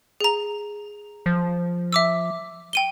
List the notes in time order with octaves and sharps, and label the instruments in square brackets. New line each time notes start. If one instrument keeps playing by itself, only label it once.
[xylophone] G#4 A#5
[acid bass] F3
[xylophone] E5 D6 E6
G5 D#7 G7